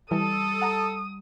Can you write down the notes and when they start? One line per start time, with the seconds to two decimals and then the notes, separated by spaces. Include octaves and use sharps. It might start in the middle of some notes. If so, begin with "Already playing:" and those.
0.11 E3 G3 A4 D#6
0.62 F#5 A5 A#5